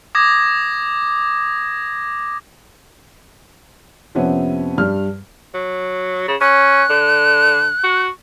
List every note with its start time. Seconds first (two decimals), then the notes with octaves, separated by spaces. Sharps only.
0.15 D6 D#6 G#6 A#6
4.15 F2 C3 B3 C#4
4.78 G2 G3 F6
5.54 F#3
6.28 C#3
6.41 C#4 F#6
6.90 D3
7.84 F#4